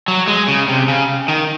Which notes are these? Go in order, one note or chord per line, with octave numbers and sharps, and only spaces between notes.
F#3
G#3
C#3
C3
C#3
D#3